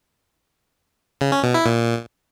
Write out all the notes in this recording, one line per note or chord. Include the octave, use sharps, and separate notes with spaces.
C#3
C#4
B2
E4
A#2